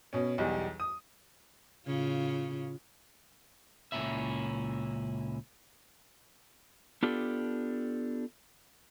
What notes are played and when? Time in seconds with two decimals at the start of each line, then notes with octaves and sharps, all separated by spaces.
0.13 B2 C#4
0.38 B1 E2 G3
0.80 D#6
1.86 A2 C#3 F4
3.92 C#2 A#2 C#4 E4 E5
7.03 B3 D4 F4 G4 A4